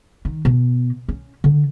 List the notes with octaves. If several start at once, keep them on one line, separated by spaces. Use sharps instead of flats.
D#3
B2
C#4
D3